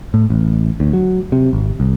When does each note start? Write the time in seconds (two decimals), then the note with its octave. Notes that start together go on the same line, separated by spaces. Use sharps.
0.14 A2
0.30 A1
0.80 D2
0.93 F#3
1.32 C3
1.53 G#1
1.80 C2